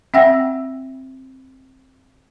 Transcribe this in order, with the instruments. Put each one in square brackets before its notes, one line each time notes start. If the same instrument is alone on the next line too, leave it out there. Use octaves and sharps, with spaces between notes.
[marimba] C4 E5 F#5 G5 E6 A#6